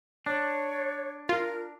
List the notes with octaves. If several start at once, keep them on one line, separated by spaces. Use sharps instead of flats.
D4 C#5
F4 A#4